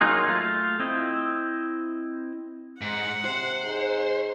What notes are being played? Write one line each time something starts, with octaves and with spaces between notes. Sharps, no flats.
F#3 A#3 D#4 F4 G#4
A3 F4 F5
C4 E4 D#5
G#2 F#5
C3 C5
G#2